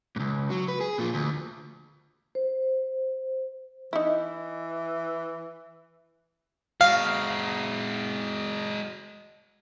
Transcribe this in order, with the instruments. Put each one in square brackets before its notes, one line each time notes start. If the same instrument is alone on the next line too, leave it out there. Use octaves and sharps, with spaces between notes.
[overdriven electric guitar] C#2 G#2
F#3
B4
G#4
A#2 F3
D2
[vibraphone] C5
[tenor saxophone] E3 [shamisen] D#4 E4
[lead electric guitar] G#3 F#4 [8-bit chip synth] F5